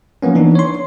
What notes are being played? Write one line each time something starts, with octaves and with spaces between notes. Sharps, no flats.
F3 A#3 B3 C#4
E3 D4 D#4
C#5 C6